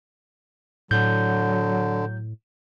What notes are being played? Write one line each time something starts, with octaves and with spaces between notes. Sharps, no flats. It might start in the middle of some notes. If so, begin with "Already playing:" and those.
A2 D3 F#3 G6